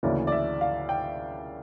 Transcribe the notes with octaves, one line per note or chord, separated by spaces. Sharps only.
D2 C#3 E3 A#3 C#4 D5
D5
E5
F5
G5